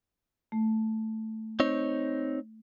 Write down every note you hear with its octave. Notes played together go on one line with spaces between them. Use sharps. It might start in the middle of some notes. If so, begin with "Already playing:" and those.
A3
C4 D#4 C#5